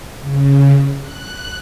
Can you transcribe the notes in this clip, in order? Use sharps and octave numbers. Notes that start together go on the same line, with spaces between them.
C#3
F#6